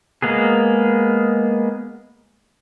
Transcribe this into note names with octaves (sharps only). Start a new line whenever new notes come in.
G#3 A#3 B3 G#4